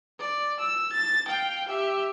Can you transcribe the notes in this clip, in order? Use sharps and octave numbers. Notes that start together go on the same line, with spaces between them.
D5
E6
A6
F5 G5
G4 E5